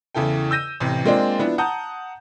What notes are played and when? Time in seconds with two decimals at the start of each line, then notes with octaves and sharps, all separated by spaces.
0.15 E2 C#3 E4 A4 G5
0.51 E6 G6 A#6 D#7
0.80 A1 C3 E3
1.05 G#3 A#3 C4 D4 F4 D5
1.39 F3 B3 D4 E4 B4
1.58 F#5 A5 A#5 D#6 G6